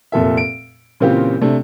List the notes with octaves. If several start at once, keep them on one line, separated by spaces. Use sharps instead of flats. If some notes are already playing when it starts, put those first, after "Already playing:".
F1 A#2 A4 E5
D7
A#2 C#3 E3 C4 F4 G4
C3 A3 D4